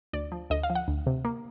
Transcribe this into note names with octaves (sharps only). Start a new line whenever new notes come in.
D2 D5
F3
D2 D#5
F5
F3
F#5
D2
C3
A#3